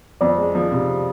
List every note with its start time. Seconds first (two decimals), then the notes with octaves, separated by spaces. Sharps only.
0.21 F2 D5
0.38 G#3
0.55 F3
0.72 C3